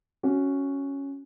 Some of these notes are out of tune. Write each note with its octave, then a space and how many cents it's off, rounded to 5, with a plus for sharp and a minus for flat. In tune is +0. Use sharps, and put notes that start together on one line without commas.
C#4 +0 F#4 +0